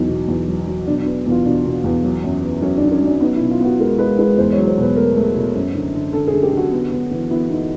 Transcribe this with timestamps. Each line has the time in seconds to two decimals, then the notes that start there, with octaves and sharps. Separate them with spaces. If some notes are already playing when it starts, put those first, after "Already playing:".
Already playing: E2 F#3 D#4
0.08 B2
0.28 E2
0.48 F#3
0.67 F#3
0.87 B2 D4
1.02 D4
1.06 B3
1.26 E2 F4
1.45 B2 D4
1.65 B2
1.84 E2
2.04 F#3
2.24 F#2
2.43 B3
2.62 F#3 C#4
2.77 D4
2.82 D#3
2.92 C#4
3.02 F#3 D4
3.20 B3 D#4
3.36 E4
3.41 B2
3.51 F4
3.60 B3 F#4
3.80 G#3 A#4
3.99 G#3 B4
4.19 G#3 B4
4.38 E2 C5
4.53 C#5
4.58 F#3
4.67 C5
4.78 B2 B4
4.96 A3 A#4
5.16 A3
5.36 B2
5.55 F#2
5.75 D3
5.94 D3
6.13 D3 A4
6.28 G#4
6.33 D3
6.43 G4
6.53 D3 F#4
6.72 B3
6.92 B3
7.11 E3
7.31 B3 E4
7.50 B3 D#4